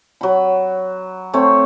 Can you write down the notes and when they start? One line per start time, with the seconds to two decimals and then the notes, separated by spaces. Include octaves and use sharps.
0.21 F#3 B5
1.34 A3 C4 C#5